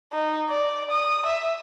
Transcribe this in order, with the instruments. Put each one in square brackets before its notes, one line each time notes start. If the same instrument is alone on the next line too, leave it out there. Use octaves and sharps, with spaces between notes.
[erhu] D#4
D5
D#6
E5